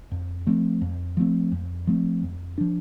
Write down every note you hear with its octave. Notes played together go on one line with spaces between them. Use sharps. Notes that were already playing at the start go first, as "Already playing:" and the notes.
F2
F3 A3 C4
F2
F3 A3 C4
F2
F3 A3 C4
F2
F3 D4